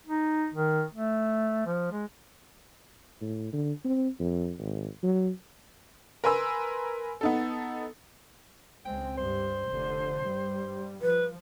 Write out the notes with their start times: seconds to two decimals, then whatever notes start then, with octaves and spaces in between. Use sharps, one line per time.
0.07 D#4
0.54 D#3
0.94 A3
1.66 F3
1.92 G#3
3.21 A2
3.53 D3
3.85 C4
4.20 F2
4.59 G#1
5.03 F#3
6.24 A#4 B4 G#5 C6 E6
7.21 B3 D#4 A4
8.85 C#2 G#3 C4 G5
9.17 G2 G3 C5
9.66 F1 D3
10.26 G2 G3
11.02 F3 B4